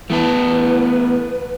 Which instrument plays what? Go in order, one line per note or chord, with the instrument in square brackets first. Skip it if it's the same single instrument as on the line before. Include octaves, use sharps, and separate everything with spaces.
[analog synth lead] E3 [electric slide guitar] A3 B3 A5 [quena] B4